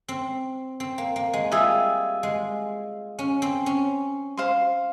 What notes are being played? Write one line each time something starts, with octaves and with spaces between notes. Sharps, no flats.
C4
C4
A#3
A#3
G#3
G3 F4 G#4 E5
G#3
C#4
C4
C#4
C5 F5 C6